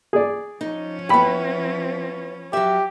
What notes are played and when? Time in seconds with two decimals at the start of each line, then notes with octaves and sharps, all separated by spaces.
0.13 G#4 D5
0.61 F3 C#4 D#4
1.09 B3 E4 G5 B5
2.53 F#3 G4 E5